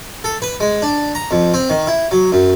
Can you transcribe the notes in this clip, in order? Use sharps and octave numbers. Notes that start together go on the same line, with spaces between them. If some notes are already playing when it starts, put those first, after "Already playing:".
A4
B4
G#3
D4
A#5
F2
C4
D#3
E4
F#3
F#2